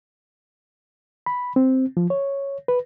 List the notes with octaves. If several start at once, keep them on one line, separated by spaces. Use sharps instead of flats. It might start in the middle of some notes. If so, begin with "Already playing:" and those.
B5
C4
F3
C#5
B4